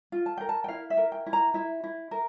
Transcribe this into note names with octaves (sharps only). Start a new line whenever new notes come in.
F4
A5
A#4 G5
A5
G5
E4 F5
E5
A#4
G5
E4
A#5
E4 E5
E4
A#4